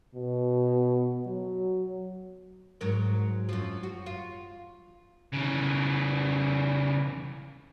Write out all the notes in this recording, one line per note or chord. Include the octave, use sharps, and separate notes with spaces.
B2
F#3
G#2 F#3 A#4
F#2 F3
F#4
F4
C#3 E3